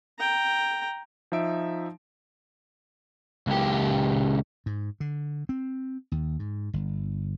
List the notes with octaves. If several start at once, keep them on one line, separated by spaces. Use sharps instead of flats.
G5 A#5
F3 D#4 E5 D7
C#2 G4
G#2
D3
C4
D#2
G#2
G1